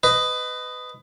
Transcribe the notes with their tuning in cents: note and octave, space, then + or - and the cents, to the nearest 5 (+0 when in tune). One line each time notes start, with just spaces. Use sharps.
B4 +25 D#5 +0